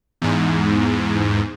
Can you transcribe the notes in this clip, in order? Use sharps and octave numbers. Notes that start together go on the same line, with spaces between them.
E2 G#2